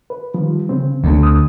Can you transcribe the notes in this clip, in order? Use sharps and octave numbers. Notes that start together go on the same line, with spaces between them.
B4
D#3 F3 G3
C#3 C4
D2
D#6